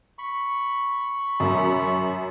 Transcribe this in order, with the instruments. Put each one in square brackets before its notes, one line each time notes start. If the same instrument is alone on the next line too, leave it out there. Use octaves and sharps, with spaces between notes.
[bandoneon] B5 C#6
[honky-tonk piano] F#2